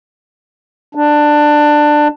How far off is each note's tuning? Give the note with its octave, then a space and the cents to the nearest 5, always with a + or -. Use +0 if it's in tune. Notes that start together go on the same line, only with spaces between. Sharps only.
D4 +15